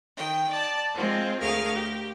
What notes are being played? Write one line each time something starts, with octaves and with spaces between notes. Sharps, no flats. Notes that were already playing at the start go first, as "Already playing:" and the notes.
D#3 G5
D5 A5
G#3 C4 F4
D2 A3 G#4 A#4 F5 F6
G4